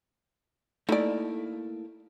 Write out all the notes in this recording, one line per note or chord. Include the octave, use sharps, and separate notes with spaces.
A3 A#3 D#4 E4 D5